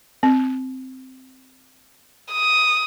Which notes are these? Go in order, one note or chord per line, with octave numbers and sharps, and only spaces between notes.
C4
D#6